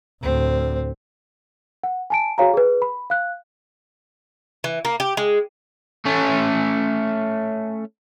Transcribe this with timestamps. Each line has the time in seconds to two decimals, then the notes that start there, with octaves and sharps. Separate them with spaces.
0.23 D2 A2 C4
1.84 F#5
2.10 G#5 A5 D7
2.38 F#4 G#4 C#5 F5 G#5 A#5
2.54 G#4 B4
2.82 B5
3.10 F5 F#6
4.64 E3
4.85 A#3
5.00 G4
5.17 G#3
6.05 A3 C#4